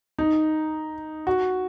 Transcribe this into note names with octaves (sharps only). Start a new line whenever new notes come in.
D#4
F#4